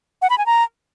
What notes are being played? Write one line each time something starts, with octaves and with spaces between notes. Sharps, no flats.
F#5
B5
G#5
A#5